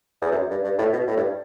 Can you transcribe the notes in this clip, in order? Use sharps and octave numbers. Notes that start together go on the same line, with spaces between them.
E2
F#2
G2
G2
A2
B2
A2
G2